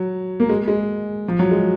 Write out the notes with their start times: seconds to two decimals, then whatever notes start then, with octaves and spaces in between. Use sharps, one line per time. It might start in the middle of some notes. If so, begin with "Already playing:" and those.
Already playing: F#3
0.40 A#3
0.49 G#3
0.68 G#3
1.28 F3
1.39 F#3
1.51 G#3